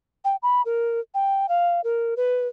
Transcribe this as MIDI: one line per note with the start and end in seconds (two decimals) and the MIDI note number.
0.25 0.36 79
0.42 0.62 83
0.65 1.00 70
1.14 1.46 79
1.49 1.81 77
1.84 2.14 70
2.17 2.48 71